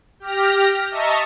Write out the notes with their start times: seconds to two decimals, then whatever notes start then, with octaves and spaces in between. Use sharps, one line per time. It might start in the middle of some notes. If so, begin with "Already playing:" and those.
0.20 G4 F6 A#6
0.91 D#5 E5 A5 A#5 C#6